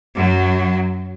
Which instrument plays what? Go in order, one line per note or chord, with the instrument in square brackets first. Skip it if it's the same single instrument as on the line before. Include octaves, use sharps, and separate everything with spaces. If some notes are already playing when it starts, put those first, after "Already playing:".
[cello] F#2 F#3